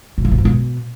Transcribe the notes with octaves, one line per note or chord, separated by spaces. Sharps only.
B2
E3
B2
G#2
B2